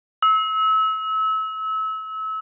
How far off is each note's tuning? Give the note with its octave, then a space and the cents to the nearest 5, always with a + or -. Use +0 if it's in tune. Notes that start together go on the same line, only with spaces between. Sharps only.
E6 -30